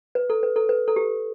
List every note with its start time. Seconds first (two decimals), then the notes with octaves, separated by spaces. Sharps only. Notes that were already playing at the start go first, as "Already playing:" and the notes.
0.15 B4
0.30 A4
0.43 B4
0.56 A4
0.69 B4
0.88 A4
0.96 G4